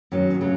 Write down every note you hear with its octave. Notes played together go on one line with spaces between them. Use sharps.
F#2 D#3 F#3
C#3 F#3